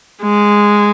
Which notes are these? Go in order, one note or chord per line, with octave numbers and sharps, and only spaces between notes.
G#3